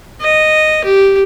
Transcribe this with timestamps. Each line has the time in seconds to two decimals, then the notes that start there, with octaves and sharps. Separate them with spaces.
0.21 D#5
0.84 G4